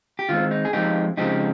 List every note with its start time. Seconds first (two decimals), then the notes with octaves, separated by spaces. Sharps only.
0.19 G4
0.29 D#3 G#3 C4 F4
0.51 D#4
0.65 G#4
0.73 F3 G#3 C4 D#4 G4
1.17 C#3 F3 G#3 C4 D#4 G4